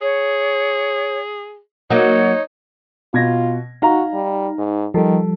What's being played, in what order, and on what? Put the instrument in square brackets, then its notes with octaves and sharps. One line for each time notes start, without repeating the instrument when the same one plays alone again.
[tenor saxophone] G#4 [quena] C#5
[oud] F#3 A#3 [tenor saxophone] D#4 [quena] C#5
[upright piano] B2 G#6 A#6 [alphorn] F4
[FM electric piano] D#4 [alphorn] F#4 [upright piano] F5 A#5
[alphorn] G3
G#2
[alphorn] D#3 [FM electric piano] F3 G3 [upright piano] A4